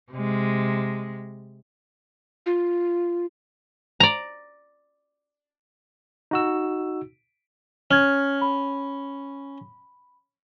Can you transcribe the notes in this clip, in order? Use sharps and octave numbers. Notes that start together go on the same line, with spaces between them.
C3 G#3
F4
D5 A#5
D#4 F#4 E6
C#4 F6 G#6
B5